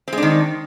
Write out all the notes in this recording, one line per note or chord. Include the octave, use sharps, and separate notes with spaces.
D#3 G#3 C4 D4